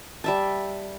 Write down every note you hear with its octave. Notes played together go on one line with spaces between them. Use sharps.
G3 E5 A5